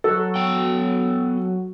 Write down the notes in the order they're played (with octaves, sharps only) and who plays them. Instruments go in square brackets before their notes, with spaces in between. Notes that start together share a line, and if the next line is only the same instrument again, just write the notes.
[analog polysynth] F#3 F#4 [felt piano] A4
[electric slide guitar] B3 G5